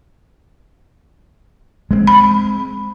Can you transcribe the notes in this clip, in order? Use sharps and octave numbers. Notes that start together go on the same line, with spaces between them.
G#3 A#3 C4
B5